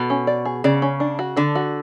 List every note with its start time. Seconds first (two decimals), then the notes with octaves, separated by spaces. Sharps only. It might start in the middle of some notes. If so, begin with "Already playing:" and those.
Already playing: B2 A4
0.10 C#4
0.27 D5
0.45 G#4
0.64 C#3 D5
0.82 C#4
1.00 D4
1.19 F#4
1.37 D3 D4
1.55 F#4